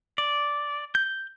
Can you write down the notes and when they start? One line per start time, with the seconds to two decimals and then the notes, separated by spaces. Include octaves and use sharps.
0.18 D5
0.95 G6